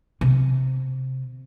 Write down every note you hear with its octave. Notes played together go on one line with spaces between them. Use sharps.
C3